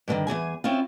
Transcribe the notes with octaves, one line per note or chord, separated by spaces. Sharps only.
G2 B2 D3 D#3
E2 A#2 G#4 G#5
C4 C#4 E4 F4